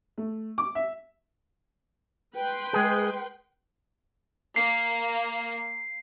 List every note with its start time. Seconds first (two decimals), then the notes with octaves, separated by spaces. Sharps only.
0.18 A3
0.58 D6
0.75 E5
2.36 B4 G5 C6
2.73 G#3 G#4
4.56 A#3 C7